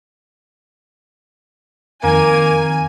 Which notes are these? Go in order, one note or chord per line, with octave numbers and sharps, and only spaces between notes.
F2 D#3 A#3 C4 G#5